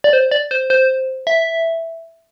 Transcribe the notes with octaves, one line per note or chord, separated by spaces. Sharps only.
D5
C5
D5
C5
C5
E5